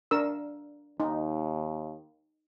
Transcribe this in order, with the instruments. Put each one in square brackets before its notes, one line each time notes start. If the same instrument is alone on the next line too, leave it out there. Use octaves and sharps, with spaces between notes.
[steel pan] D4 A#4 E6
[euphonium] D#2 [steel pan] D#4